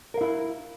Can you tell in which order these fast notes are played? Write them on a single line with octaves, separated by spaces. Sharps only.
A#4 F5 E4